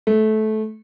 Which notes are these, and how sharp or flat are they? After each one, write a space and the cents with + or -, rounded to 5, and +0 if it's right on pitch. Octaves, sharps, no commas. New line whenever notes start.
A3 -20